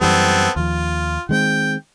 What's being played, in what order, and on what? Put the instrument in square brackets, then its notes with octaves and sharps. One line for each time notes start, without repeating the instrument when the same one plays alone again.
[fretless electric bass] F#2 E3 G3 [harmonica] B3 C4 A4
[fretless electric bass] D#2 F3 [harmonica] F4
[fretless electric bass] D#3 G#3 C4 [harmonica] G5